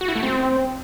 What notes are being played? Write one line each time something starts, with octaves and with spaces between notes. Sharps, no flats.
F#4
E4
A3
C4